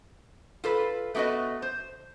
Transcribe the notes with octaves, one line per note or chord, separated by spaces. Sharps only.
F4 A4 B4
A3 B3 F#4 B4 D#5
C5